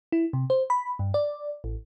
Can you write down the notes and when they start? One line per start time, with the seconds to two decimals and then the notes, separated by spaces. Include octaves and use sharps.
0.12 E4
0.33 C3
0.50 C5
0.70 B5
0.99 G2
1.14 D5
1.64 A1